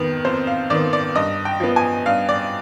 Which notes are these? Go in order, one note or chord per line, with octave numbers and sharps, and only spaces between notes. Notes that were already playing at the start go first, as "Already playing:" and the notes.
Already playing: F2 D#3 B3
F2 C5
F5
D#3 B3 D5
D5
G2 D#5
G5
F3 B3
G#5
G2 F5
D5